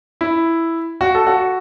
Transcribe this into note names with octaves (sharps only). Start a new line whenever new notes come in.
E4
F#4
A4
F#4